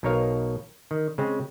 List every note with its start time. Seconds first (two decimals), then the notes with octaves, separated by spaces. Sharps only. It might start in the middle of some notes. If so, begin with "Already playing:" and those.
0.03 B1 B2 D#4 A#4 C#5 F5
0.91 D#3
1.18 C#3 G#3 C4